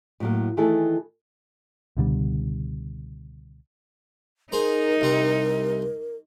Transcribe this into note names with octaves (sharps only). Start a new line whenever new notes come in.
A2 F#3 A#3
D#3 E3 A3 E4 G#4 A4
C#2 B2 D3 G3
D#4 G#4 A#4 C5 A#5
C2 C4 A#5